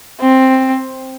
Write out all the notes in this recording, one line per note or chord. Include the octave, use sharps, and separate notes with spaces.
C4